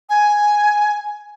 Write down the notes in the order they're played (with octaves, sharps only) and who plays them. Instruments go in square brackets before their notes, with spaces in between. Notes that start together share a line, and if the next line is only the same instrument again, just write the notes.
[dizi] G#5